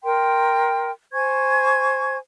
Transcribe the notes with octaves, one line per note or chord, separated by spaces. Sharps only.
A#4 G5 C6
C5 G#5 C#6 G#6